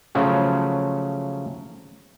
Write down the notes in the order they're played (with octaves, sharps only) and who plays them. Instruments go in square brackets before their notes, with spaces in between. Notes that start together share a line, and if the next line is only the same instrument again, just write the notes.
[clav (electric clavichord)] C#3 F3 F#3 A3 C#4